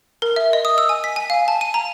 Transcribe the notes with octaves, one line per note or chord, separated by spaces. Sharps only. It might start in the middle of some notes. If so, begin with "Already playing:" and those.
A#4
E5
D#5
D#6
E6
G#5
B6
G#5
F5
A5
D#7
A#5